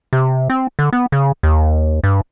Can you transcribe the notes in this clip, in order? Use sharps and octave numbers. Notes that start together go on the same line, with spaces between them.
C3
C4
D3
B3
C#3
D#2
G2